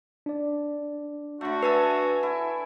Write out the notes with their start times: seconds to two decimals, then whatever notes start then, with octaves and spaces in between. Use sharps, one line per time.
0.26 D4 D5
1.41 D3 A3 F#4
1.63 B4 E5 G#5 A5
2.23 E4